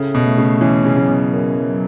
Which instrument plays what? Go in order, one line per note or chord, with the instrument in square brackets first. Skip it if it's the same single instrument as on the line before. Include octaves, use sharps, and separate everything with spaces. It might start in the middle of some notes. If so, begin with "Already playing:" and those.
Already playing: [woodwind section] A2 [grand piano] C#3
[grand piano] B2
[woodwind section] A3
[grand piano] C#3
[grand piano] E3 [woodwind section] C#4
[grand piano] C#3
[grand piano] C#3 [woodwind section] F#3
[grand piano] B2
[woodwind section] F#2
F#3